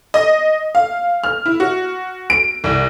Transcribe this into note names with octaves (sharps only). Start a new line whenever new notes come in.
D#5
F5
F6
E4
F#4
D7
C2